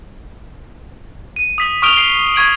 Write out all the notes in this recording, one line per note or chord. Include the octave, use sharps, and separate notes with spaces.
D#7
D#6 B6 F#7
C#6 D#6 F6 D7 F7 G7
C7 D7 G7
C#6 G#6 D7 F#7